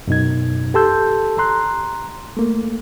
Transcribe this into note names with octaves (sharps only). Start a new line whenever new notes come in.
F#2 B2 D#4 G#6
G4 A4 A5 C6 E6 G6
A#5 C6 F#6
A3 A#3